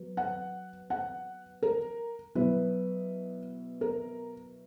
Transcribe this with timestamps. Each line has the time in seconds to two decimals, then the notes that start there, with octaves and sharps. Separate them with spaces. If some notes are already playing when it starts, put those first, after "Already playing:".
Already playing: F#3 B3
0.17 F#5
0.90 F#5
1.63 A#4
2.35 B2 F#3 B3 E4 B4
3.81 A#4